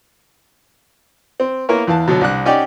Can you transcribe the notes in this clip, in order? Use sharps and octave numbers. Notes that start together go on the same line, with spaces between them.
C4
A#3 B3 E4 A#4 C#5
E2 E3 F5 A5
B2 D3 F#3
C2 D4 F#6
C#4 D#4 G4 D5 F#5 G5